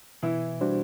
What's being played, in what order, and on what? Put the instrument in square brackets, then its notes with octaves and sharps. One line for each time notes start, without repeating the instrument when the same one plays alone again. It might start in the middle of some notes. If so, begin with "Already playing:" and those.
[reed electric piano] B2 [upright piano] E3 E4
[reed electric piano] G3 D4 F#4 C5